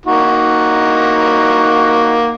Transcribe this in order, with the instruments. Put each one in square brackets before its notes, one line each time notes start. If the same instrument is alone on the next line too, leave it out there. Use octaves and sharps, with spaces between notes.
[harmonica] A#3 D#4 F#4